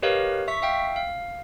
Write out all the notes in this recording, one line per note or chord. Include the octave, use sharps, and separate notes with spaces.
G4 A#4 B4 C#5 D#5 F5
E5 C#6 B6
E5 F5 G5
F5